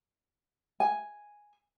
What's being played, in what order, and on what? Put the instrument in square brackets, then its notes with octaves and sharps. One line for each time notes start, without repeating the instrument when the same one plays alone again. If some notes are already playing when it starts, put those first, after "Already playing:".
[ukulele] G#5